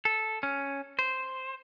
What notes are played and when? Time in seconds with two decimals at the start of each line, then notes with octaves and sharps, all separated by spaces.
0.05 A4
0.43 C#4
0.99 C5